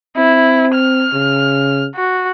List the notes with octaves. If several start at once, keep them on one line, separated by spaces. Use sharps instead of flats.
C4 E4
F6
C#3
F#4